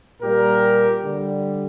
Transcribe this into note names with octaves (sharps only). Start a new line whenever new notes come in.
A#2 G3 G4 A#4
D3 G3